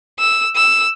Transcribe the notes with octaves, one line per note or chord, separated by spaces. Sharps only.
E6
E6